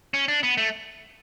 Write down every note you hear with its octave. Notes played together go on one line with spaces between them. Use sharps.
C#4
D4
B3
A3